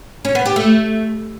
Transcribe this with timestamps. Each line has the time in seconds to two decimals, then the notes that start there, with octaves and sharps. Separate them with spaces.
0.25 C#4
0.35 B3
0.46 G4
0.56 A3